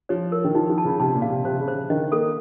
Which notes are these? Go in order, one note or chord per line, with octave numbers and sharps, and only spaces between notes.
F3 C#5
A#4
D#3
F3 D#4
F3
A5
C#3
C3 A5
A#2
F5
C3
C3 C5
C#3
C5
C#3
D#3 D#5
A#3 A4